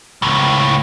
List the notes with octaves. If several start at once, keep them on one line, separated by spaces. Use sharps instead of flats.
C#2 A2